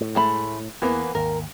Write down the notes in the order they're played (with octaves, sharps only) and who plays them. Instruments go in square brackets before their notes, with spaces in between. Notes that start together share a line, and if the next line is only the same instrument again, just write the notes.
[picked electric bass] A2
[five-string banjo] G#3 A3 B5
[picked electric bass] E2 [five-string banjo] E3 A#3 B3
[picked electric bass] G#1 D#2 [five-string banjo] A#4